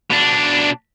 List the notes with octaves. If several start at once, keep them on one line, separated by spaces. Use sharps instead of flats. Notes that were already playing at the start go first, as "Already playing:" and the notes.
B2 D4